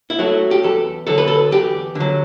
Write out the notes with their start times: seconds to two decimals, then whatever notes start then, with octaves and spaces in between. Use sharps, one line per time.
0.10 E4
0.19 F#3 A3 F#4
0.51 G4
0.63 E2 A4
1.07 D3 F#3 A4
1.18 B4
1.28 A4
1.51 E2 G4
1.95 D3
2.00 F#3